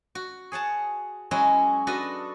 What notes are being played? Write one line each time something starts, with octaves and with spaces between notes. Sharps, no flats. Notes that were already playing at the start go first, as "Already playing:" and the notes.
F#4
G#4 C#5 F#5 A5
F#3 G#3 C#4 E4 F#4
D4 F#4 A4 B4 D#5